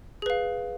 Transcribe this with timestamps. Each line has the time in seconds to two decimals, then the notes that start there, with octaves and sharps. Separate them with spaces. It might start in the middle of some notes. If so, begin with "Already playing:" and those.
0.22 G#4
0.26 B4
0.30 F5